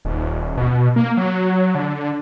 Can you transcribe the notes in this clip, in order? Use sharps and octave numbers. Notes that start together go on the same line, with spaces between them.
D#1
B2
A#3
F#3
D3